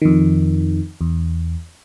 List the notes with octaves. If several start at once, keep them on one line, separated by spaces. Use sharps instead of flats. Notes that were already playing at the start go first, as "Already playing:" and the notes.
F2 D#3
E2